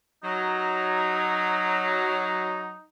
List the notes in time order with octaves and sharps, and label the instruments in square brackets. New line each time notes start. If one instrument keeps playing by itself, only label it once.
[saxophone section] F#3 [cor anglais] D#4